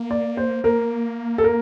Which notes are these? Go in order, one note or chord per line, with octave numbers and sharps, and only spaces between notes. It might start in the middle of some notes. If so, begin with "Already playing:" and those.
Already playing: A#3
D5
C5
A#3 A#4
A4
A#4